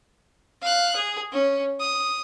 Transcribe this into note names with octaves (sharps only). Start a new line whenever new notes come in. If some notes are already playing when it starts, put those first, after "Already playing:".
F5 F#6
G#4
C#4
D#6